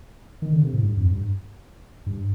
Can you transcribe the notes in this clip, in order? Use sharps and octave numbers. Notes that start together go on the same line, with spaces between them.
D#3
D3
C3
A2
G2
F2
G2
G2